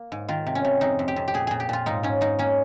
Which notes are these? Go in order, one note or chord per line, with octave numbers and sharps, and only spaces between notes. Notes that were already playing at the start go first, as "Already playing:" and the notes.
Already playing: A#3
G#2
D#3 F4
C3
C#4
C3
F2 D#4
F2
G4
F2
G4
A#2 G#4
A#2 G#4
G4
A#2 F4
G#2 D#4
G#2 C#4
G#2 D#4
A#3 C#4